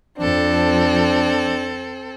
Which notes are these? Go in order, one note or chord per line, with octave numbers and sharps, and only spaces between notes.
F2 F3 C4 D4 A4